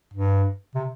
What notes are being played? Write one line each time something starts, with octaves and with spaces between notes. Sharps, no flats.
G2
C3